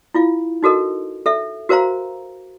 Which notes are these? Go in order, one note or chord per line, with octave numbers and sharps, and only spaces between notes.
E4 F4 F5
D#4 F#4 A4 A#4 D#5
A4 E5
F#4 A#4 C5 F5 A#5